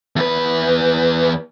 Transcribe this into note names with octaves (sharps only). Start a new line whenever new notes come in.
E2 B4